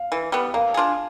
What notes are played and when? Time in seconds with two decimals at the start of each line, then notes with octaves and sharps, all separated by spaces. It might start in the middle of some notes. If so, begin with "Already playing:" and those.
Already playing: F5
0.12 E3
0.32 G3 B3
0.54 A#3 F5
0.74 D4 F4 G#4